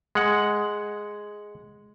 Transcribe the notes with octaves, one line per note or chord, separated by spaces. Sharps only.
G#3 F#5